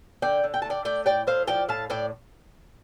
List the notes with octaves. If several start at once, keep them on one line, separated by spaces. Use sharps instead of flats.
D3 D5 G5
D3
G5
A3 A5
D5 G5
A3 D5 G5
A2 D5 G5
A2 C5 F5
F3 D5 G5
A2 F5 A5
A2 D5 G5